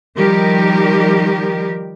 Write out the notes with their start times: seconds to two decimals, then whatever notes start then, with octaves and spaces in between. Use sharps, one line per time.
0.16 D#3 F3 G3 G4 A#4